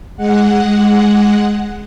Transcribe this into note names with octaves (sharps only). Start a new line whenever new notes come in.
G#3 F#5